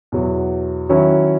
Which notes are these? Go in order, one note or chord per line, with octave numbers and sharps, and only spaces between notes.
E2 B2 F#3
D#3 F#3 C#4 E4